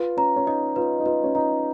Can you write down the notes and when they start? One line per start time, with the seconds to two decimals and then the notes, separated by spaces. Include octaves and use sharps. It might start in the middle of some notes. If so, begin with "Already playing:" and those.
Already playing: F4 B4
0.17 C#4 A#5
0.36 C#4
0.47 D#4 D#5
0.76 F4 B4
1.00 D#4
1.06 F4 B4
1.24 C#4
1.35 D#4 A#5